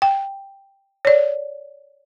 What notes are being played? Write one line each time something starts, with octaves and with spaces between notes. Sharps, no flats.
G5
C#5 D5